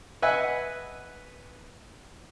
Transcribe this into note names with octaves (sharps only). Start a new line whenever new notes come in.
B4 D#5 E5 F#5 G#5